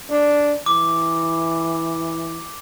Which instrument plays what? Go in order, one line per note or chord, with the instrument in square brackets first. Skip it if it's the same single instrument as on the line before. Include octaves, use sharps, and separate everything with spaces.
[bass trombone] D4
[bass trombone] E3 [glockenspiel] D6